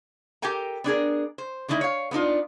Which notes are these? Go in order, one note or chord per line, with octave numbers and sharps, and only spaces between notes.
G4 A4 A#4 G5 G#5 A#5
B3 D4 G#4 A#4
C5
D3 D#3 A3 D#4 E4
C#5 F5
B3 D4 D#4 F4